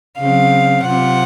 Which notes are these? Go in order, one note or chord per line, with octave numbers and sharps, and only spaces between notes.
C#3 F#3 C4 F5
C3 F#3 C4 F4 F#5